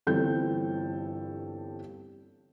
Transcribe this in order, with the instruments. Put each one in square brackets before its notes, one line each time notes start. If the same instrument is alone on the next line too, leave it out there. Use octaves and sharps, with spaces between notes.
[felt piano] G1 G2 E3 C4 A4 G6